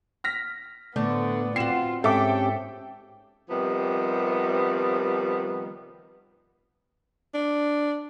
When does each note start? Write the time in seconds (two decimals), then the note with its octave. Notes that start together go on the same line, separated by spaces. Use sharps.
0.24 F6 A#6 B6
0.96 A2 D3 A3 B3 C5 D5
1.56 C4 F4 F#4 C7 E7
2.04 G#2 C4 C#4 G4 A4 E5 G5 D6
3.49 C3 D#3 F3 G3 B3
7.34 D4